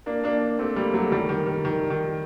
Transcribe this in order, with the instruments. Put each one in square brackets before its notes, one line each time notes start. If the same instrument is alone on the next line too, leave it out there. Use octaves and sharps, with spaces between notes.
[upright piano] A#3 D4
A#3 D4
A3 C4
G3 A#3
F#3 A3
D#3 G3
D#3
D#3
D#3
D#3